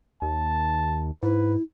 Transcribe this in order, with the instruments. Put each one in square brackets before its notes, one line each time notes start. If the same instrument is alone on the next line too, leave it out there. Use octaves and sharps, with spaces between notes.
[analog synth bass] D#2 [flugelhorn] A5
[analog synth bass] G#2 [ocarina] E4 [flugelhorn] B4